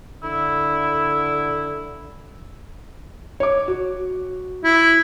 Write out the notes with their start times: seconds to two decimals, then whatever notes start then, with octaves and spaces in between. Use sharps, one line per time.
0.23 D3 E4
3.40 C#5 D6
3.68 F#4
4.64 E4